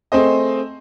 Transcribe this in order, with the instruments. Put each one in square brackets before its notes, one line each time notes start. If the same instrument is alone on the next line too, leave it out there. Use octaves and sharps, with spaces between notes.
[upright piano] A3 C4 G#4 C5 D#5